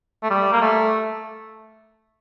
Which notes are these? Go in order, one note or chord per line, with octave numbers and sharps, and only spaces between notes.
A3
G3
A#3
A3